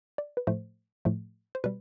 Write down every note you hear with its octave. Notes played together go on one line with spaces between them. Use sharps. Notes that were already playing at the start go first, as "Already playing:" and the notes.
D5
B4
A2 F3 A3 C5
A2 F3 A3
C5
B2 G3 B4